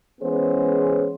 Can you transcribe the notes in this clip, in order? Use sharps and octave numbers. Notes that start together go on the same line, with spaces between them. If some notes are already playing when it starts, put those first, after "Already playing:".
E3 G#3 B3 C#4 G#4 C5